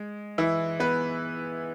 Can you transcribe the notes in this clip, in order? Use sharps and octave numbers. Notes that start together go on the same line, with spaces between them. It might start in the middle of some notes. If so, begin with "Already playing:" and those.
Already playing: G#3
E3 E4
B3 B4